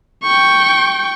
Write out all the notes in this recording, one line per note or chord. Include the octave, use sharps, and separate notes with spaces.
G5 C#6